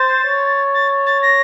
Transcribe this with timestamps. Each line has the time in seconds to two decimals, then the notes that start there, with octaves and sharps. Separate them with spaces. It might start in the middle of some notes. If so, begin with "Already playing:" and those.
Already playing: C5 A6
0.25 C#5
0.73 A6
1.06 A6
1.22 A#6